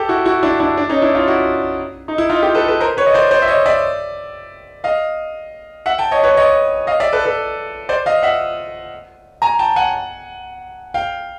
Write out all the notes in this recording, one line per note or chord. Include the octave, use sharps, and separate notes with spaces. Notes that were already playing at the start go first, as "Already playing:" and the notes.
Already playing: G4 A4
E4 F#4
E4 F#4
D4 E4
D4 E4
D4
C#4 D#4
D4 E4
D#4 F4
E4 F#4
D#4
E4
D#4 F4
F4 G4
A4 B4
A4 B4
A#4 C5
B4 C#5
D#5
C5 D5
C5 D5
E5
C#5 D#5
D5 E5
D#5 F5
E5 F#5
G5 A5
C#5 D#5
B4 C#5
C#5 D#5
D#5 F5
D5 E5
A4 B4
A4 B4
C5 D5
D#5 F5
E5 F#5
G#5 A#5
G5 A5
F#5 G#5
F5 G5